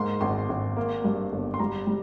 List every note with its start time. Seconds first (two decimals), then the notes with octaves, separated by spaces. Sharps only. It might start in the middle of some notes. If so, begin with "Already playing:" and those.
Already playing: G#2 A#3 C6
0.21 G#1 C6
0.49 G#1
0.77 A#3
1.04 G2
1.32 G1
1.54 C6
1.59 G3 A#5
1.87 G3